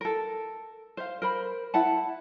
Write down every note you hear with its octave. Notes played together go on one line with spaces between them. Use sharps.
A4 A#4
C5 F5
A#4 C5 B5
E4 F#5 A5